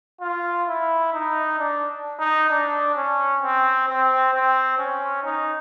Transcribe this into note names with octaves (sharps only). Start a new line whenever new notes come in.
F4
E4
D#4
D4
D#4
D4
C#4
C4
C4
C4
C#4
D#4